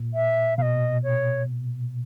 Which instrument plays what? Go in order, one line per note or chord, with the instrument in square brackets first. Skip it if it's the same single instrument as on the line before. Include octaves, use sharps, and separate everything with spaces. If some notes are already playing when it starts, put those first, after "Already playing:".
Already playing: [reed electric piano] A#2
[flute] E5
[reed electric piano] B2 [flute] D#5 F5
[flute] C#5